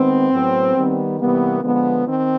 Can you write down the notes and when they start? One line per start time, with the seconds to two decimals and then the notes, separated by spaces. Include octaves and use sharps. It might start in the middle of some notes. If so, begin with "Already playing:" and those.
Already playing: D#3 G#3 B3 C4
0.32 A2 F#3 B3
0.76 D#3 G3 B3
1.19 C3 E3 G3 A#3 B3
1.63 D3 F3 G#3 B3
2.07 D#3 C4